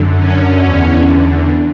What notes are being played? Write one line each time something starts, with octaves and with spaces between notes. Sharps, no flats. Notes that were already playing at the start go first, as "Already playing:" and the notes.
Already playing: F#2 D3
C#4
E2 D3